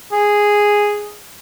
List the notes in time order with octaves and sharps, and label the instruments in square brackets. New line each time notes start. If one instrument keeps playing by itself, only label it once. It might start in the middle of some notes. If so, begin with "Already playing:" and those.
[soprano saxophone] G#4